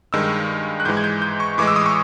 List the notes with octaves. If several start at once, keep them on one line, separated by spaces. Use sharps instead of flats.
G2 D#3 G#3 E6
F#6
G#2 E3 G#3 G6
G#6
G6
G6
C#6
A2 E3 G#3 D6
E6
D#6
C#6